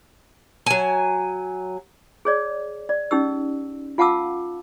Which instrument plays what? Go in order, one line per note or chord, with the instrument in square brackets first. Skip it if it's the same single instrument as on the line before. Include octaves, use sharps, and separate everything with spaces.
[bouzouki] F#3 G#5
[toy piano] G#4 C#5 D5
D5
C#4 D#4 G4 E6
F4 F5 F#5 A5 D6 E6